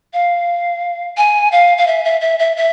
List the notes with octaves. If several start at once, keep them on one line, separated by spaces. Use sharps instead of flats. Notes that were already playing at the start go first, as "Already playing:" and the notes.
F5
G#5
F5
F5
E5
E5
E5
E5
E5